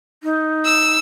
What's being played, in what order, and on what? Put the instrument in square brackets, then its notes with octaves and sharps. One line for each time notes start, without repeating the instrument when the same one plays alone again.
[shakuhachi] D#4
[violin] E6